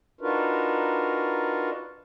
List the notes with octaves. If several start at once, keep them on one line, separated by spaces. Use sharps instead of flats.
D4 D#4 F4 F#4 A#4 B4